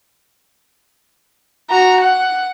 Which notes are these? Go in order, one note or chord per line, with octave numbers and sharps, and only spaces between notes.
F#4 A#5
F#5